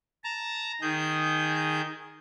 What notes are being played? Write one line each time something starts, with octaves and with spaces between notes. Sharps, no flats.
A5 A#5
D#3 G#4 G6